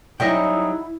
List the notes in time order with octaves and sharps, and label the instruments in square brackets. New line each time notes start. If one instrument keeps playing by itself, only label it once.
[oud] F#3 G3 C#4 [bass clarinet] D#4 [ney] E4 [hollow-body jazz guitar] D#5 E5 G5